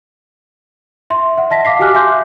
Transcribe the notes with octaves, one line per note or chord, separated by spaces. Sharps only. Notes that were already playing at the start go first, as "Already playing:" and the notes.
E5 C6
E5 F#5
D#5 A5 A#6 B6
F5 D6 B6 C7
F#4 G4 G#5 D6 F6 F#6
E5 G#5 C6 D6 G6